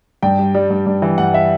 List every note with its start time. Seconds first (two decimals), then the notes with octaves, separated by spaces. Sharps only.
0.22 G2 G5
0.39 G3
0.54 G3
0.70 G2
0.86 G2
1.02 E3
1.18 G2 F#5
1.34 E5